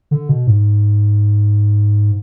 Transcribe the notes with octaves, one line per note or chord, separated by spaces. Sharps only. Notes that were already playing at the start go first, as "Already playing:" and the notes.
D3
B2
G#2